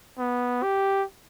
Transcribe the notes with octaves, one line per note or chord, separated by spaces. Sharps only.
B3
G4